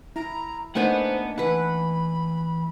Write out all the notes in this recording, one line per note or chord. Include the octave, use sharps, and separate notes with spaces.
E4 A#5
A3 A#3 D4 D#4 B4 C5 F#5 G#5
E3 B4 F#5 B5